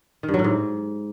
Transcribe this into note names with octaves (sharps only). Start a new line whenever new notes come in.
D#3
G2
F#3
A2
G#2